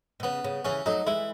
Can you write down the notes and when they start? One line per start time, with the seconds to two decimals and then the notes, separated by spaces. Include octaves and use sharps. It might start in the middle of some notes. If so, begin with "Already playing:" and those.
0.20 B2
0.23 C#3 B3
0.44 C#3
0.65 C#3 E3 C#4
0.86 F#3 A3 D#4
1.07 E3 G#3 E4